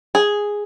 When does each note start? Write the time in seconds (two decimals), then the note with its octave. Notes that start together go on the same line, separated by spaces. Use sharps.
0.15 G#4